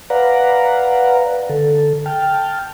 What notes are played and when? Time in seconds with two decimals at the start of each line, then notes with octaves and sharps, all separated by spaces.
0.10 B4 D5 F5 F#5 A#5
1.49 D3 A4
2.06 G5 A5 F6